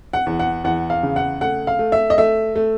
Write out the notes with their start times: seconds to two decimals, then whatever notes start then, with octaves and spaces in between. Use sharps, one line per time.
0.13 F#5
0.26 E2
0.39 F#5
0.64 E2 F#5
0.90 F5
1.03 C#3
1.16 F#5
1.41 A3 F#5
1.67 F5
1.79 A3
1.92 E5
2.10 D#5
2.18 A3 E5
2.55 A3